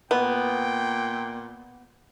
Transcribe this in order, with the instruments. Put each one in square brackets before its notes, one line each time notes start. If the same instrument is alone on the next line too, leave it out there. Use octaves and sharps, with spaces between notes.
[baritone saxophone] A#2 [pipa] B3 [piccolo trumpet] G5